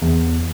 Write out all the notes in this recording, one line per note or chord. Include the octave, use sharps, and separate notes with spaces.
E2